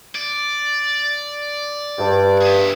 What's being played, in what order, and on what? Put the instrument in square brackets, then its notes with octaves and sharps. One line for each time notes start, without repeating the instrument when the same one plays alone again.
[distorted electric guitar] D5
[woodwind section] G2
[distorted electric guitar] G#4 E5